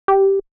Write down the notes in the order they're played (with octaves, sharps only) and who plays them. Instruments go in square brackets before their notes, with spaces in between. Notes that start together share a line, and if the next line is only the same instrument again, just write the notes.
[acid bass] G4